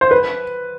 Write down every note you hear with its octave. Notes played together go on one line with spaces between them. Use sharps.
C5
B4